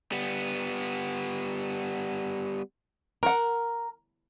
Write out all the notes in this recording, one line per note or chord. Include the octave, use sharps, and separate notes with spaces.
G3 B3
A#4 F#5 A#5